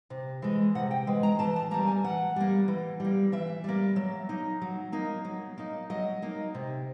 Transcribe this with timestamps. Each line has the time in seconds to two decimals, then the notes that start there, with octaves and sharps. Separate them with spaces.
0.10 C3
0.42 E3 G#3
0.75 C3 F#5
0.91 G5
1.07 E3 G#3
1.23 A#5
1.39 E3 A5
1.56 A5
1.71 G3 A#3 A#5
1.87 G#5
2.04 E3 F#5
2.36 G3 A#3
2.68 E3
3.00 G3 A#3
3.32 E3 E5
3.64 G3 A#3
3.96 F#3
4.29 A#3 D#4
4.62 F#3
4.92 A#3 D#4
5.25 F#3
5.58 A#3 D#4
5.90 F#3 D#5
6.22 A#3 D#4
6.54 C3